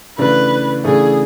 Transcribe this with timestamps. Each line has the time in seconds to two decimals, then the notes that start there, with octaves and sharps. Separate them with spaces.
0.18 C#3 E3 A3 D4 B4
0.84 C#3 E3 A3 D4 G#4